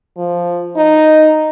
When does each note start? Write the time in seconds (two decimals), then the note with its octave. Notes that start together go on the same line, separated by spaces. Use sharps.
0.17 F3
0.76 D#4